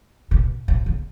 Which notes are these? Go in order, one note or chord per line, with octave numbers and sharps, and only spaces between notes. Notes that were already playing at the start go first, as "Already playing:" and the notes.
B2
B2
C#3